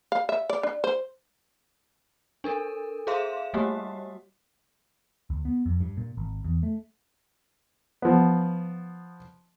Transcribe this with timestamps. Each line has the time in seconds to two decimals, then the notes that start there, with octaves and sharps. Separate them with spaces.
0.12 F5
0.29 E5
0.50 D5
0.63 D4
0.84 C5
2.44 D4 A4 A#4
3.07 G#4 C5 E5 F5 C6 E7
3.54 G3 A3 A#3 F#4 G4
5.30 D2
5.45 B3
5.66 F2
5.81 G2
5.97 A#2
6.17 G#1
6.44 E2
6.63 A3
8.02 F3 B3